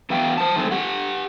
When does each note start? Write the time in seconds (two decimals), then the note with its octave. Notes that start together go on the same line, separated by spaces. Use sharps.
0.10 E3 B3 F#4 E5 F5 G5
0.38 C5 A5
0.56 D#3 G#3 A3 C4
0.71 G4 F#5